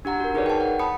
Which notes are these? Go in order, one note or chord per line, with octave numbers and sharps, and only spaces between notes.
D4 G4 F#5 A#5
F#4 A#4
D#4 G#4 A#4 B4 C#5 D5
G5 A5
F#5
A5 B5 D#6 C#7